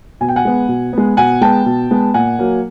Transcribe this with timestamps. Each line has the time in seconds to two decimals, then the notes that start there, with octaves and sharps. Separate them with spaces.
0.21 B2 G#5
0.29 G5
0.36 F#5 G#5
0.45 G#3 B3
0.68 B2
0.93 G#3 B3
1.17 B2 F#5 G#5
1.41 G#3 B3 G5 A5
1.66 B2
1.91 G#3 B3
2.14 A#2 F#5 G#5
2.39 F#3 A#3